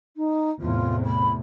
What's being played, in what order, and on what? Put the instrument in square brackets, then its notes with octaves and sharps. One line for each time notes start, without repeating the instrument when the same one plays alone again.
[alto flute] D#4
[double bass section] E2 A2 C3 [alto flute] F4
[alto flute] B5